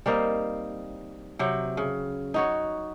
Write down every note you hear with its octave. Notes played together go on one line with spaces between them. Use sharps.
G3 A#3 C4 D#4
C3 F#3 G5
C#3
D#4 F#4 C#5